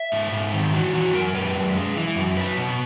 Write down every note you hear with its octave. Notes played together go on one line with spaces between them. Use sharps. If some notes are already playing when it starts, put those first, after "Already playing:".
Already playing: E5
G#2
G#2
D#3
E3 F#4
E3 F#4
F#2 A#4
F#2 B4
F#2
G#3
E3
F#2
F#3 B4
B2